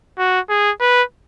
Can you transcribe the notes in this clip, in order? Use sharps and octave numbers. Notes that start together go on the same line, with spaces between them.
F#4
G#4
B4